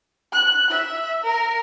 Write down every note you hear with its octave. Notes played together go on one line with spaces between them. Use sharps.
F#6
E5
A#4